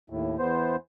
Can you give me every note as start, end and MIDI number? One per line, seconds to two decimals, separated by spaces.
0.10 0.37 39
0.10 0.37 45
0.39 0.76 40
0.39 0.76 59
0.39 0.76 72